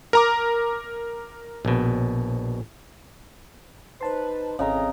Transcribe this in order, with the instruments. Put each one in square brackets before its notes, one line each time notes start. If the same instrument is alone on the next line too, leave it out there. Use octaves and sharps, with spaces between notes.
[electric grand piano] A#4 A#5 D6
[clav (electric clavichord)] A#1 B2
[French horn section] D#4 B4 [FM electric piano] C5 A5 C6
[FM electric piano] G#1 C4 [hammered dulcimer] C#3 D#5 A#5 [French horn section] E3 G#4 A4